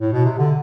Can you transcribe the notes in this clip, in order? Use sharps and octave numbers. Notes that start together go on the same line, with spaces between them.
A2
B2
C3
D3